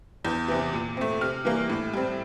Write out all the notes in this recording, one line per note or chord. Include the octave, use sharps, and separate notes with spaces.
E2 G6
C3 E3
A#2
A3 C4
C3 F6
E3 G3 A#3
A2
G3 C4